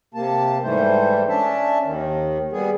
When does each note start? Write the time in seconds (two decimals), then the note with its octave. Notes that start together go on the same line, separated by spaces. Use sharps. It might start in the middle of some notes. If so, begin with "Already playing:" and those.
0.14 C3 A#3 A5
0.63 G#2 E3 G3 A3 C5
1.29 C#4 D4 E5 A5
1.84 D#2 D#3
2.52 G3 B3 G#4